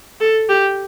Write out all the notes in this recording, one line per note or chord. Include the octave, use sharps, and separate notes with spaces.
A4
G4